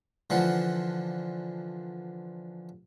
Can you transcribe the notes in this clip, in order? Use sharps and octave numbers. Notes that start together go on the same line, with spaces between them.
D3 E3 F3 F#5